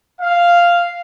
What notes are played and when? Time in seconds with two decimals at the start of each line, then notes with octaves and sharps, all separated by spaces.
0.21 F5